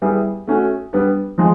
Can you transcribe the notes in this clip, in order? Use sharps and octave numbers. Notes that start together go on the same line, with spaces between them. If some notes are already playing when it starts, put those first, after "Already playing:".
G3 B3 E4 G#4
A3 C#4 F#4
G3 B3 D4
F3 G#3